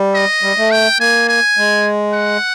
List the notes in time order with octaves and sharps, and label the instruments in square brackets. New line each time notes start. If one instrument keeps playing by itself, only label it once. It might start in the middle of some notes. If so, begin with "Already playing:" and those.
Already playing: [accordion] G3
[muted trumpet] D#5
[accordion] G3
A3
[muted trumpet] G5
[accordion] A#3 [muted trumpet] G#5
[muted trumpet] G#5
[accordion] G#3
[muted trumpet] F#5